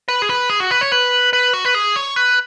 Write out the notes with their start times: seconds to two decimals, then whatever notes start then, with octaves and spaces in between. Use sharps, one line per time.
0.08 B4
0.22 G#4
0.29 B4
0.50 G#4
0.60 F#4
0.71 B4
0.81 C#5
0.92 B4
1.33 B4
1.53 F#4
1.65 B4
1.75 G#4
1.96 C#5
2.16 B4